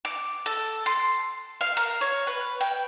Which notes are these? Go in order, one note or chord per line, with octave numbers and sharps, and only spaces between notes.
D6
A4
C6
F5
A#4
C#5
B4
G5